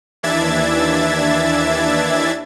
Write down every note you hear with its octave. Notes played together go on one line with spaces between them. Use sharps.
D#2 E3 D4 E5 G#6 A6